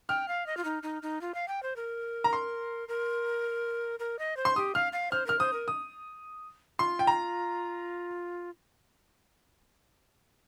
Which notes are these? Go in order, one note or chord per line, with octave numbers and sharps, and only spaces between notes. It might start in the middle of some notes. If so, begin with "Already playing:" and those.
G5 F6
F5
D#5
F4
D#4
D#4
D#4
F4
F5
G5
C5
A#4
A#5
C6
A#4
A#4
D#5
C5
C6
G4 D#6
F5 F6
F5
C5 F6
A#4 F6
C5 D#6
A#4
D#6
F4 C6
G5
A#5